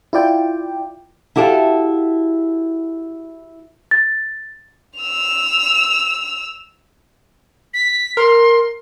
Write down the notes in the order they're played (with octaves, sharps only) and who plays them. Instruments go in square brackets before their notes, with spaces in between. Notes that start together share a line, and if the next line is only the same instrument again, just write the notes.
[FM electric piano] E4 F4 D5 G5
[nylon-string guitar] E4 F#4 G4 A4 F5
[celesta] A6
[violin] E6 F7
[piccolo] B6
[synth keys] A#4 [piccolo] C6